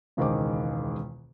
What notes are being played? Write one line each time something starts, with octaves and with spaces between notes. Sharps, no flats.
E1 C#2 D#3 G#3 C5 D6